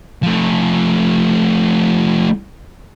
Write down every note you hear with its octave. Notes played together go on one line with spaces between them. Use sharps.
F3 A3